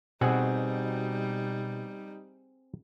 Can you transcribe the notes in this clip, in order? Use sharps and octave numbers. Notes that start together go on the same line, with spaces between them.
B2 G3 C4 D#4 G#4 F#5